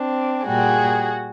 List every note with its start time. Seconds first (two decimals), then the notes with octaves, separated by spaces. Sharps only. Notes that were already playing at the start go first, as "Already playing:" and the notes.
Already playing: C4 D4
0.46 A#2 G3 F#4 G#4